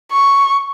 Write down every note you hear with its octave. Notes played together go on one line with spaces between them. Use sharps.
C#6